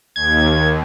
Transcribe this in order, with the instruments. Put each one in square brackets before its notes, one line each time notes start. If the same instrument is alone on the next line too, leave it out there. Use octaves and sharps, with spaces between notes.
[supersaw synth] D#2 [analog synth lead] G#6